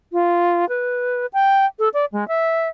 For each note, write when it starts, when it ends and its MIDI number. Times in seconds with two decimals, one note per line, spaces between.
0.13 0.68 65
0.69 1.26 71
1.33 1.65 79
1.79 1.89 69
1.94 2.05 74
2.12 2.27 56
2.28 2.69 76